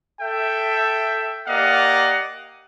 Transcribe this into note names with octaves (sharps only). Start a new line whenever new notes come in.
A4 E5 G5
A#3 G4 D5 D#5 F5 F#5